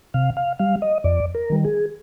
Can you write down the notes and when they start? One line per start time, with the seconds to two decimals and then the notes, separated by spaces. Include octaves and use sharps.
0.14 C3 F5
0.37 F5
0.59 G3 F5
0.82 D#5
1.04 F2 D5
1.35 A#4
1.50 D#3 G3
1.64 G#4